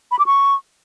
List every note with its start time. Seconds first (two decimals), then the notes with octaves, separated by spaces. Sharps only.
0.11 B5
0.19 D6
0.26 C#6